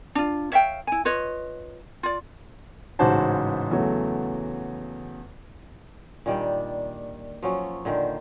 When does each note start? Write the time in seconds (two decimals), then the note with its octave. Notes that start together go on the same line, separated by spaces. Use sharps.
0.15 D4 F4
0.52 C#5 E5 F5 G5
0.87 E4 G#5
1.05 F4 B4 C#5 D#5
2.03 F4 D5
2.99 A1 G#2 C#3 F#4 C5 A5
3.71 E2 C#3 F#3 A3
6.26 A#2 D#3 G3 D4
7.43 F3 F#3 C#4
7.85 A#2 D3 D#3 C5